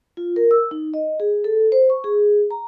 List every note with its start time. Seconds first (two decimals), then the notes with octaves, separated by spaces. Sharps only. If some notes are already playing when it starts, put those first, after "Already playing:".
0.17 F4
0.36 A#4
0.51 E6
0.71 D#4
0.94 D#5
1.20 G#4
1.44 A4
1.72 C5
1.90 C#6
2.04 G#4
2.51 A#5